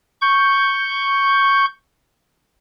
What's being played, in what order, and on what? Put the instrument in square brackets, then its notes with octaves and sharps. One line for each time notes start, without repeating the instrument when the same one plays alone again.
[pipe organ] C#6 G6